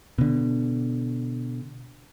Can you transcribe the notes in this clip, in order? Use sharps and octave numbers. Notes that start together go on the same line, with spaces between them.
B2 D3